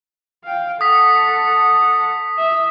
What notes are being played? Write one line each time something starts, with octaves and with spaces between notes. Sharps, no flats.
F5 G5
A4 F#5 D#6 B6
E5